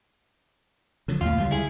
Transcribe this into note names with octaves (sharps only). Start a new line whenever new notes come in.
D3 F3 F#3
D#2 A2 F4
C#2 D3 G3
E4 G#4